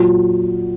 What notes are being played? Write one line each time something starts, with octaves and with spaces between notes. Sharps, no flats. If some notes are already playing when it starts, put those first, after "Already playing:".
Already playing: A#2 F#3